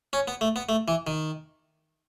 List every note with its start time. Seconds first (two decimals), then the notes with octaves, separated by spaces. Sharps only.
0.13 C#4
0.28 B3
0.41 A3
0.56 B3
0.69 A3
0.88 E3
1.07 D#3